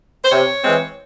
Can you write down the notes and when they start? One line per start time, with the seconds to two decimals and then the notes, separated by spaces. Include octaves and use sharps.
0.24 C5
0.31 C3 C#5
0.63 E3 G#3 C4